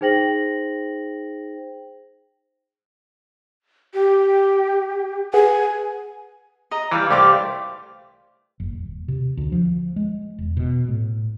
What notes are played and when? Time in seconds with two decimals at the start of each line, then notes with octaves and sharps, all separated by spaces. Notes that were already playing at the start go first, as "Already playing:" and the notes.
0.01 D#4 G#4 C5 G5 A#6 F#7
3.94 G4
5.34 G#4 B4 F#5 G#5
6.71 D#5 A#5
6.91 E3 G3 F5 B5
7.11 C2 A3 G4 C5 F5 D6
8.60 F#1
8.73 D#1
9.08 C3
9.37 D2
9.52 F3
9.96 G#3
10.39 E1
10.57 B2
10.88 A2